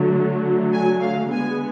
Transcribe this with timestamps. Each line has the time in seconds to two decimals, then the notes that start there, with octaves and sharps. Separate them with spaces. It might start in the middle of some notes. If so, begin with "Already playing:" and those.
Already playing: D3 F#3 A3
0.72 G#5
1.01 F5
1.31 D3 G#3 B3 G#5